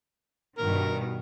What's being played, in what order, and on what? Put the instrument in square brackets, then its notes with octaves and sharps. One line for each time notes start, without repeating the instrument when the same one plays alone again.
[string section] G2 B2 D#3 [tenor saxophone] A#4